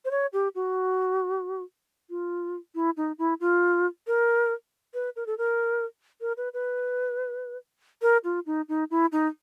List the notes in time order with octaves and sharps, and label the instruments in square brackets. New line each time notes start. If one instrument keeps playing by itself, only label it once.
[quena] C5
C#5
G4
F#4
F4
E4
D#4
E4
F4
A#4
B4
A#4
A4
A#4
A#4
B4
B4
A#4
F4
D#4
D#4
E4
D#4